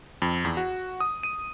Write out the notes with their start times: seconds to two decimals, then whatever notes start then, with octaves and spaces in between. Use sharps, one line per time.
0.22 F2
0.45 E2
0.57 F#4
1.00 D#6
1.23 D#7